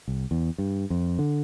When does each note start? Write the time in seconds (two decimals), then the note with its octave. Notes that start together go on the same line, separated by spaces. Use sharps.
0.08 C2
0.31 E2
0.58 G2
0.90 F2
1.19 D3